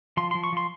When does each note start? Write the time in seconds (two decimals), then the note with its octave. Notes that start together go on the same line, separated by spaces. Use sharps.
0.17 F3 C6
0.31 F3 C6
0.44 C#6
0.52 F3 C6